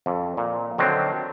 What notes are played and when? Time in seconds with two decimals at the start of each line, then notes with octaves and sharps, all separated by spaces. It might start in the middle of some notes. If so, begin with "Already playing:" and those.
0.06 F2
0.37 A#2
0.78 D3 D#3 F#3 C4